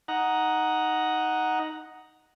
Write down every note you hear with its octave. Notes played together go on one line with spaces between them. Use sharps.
D#4 F#5 A#5